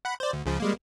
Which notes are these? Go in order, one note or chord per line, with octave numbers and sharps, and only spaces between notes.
F#5 B5
C5 D5
D2
C#2 C#3 F3
G3 G#3 A#3